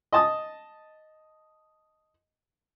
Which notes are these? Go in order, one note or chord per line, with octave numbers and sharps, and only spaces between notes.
D#5 A5 D#6